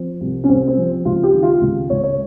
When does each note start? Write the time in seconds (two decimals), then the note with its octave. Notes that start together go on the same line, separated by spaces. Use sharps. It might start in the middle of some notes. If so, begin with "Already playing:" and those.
Already playing: F3 C4
0.21 C2
0.44 C#4
0.49 C2 C4
0.68 C4
0.77 F3
1.05 C#2 F4
1.23 G4
1.34 D#3
1.43 F4
1.61 C#2
1.90 C#2 C#5
2.03 C#5